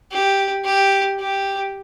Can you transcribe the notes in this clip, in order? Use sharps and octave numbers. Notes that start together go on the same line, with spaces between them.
G4
G4
G4